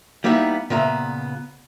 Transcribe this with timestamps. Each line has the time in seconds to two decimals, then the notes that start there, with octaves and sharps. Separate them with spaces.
0.24 G3 A#3 B3 D#4 E4
0.70 A#2 C#3 B3 E5 A#5